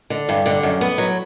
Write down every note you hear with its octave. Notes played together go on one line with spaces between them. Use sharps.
D3
G2
D3
F#2
B3
F#3